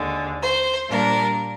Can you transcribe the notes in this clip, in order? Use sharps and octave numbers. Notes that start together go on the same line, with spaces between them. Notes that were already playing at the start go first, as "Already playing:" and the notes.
Already playing: D#2 D3 G#3
C5
A#2 G3 A#3 D4 A#4